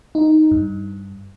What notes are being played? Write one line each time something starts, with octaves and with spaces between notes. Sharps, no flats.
D#4
G2